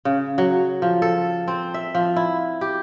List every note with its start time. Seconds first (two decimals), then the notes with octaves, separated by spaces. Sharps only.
0.05 C#3
0.38 F#3
0.82 F3
1.02 A4
1.48 C4
1.74 E5
1.95 F3
2.16 E4
2.61 G4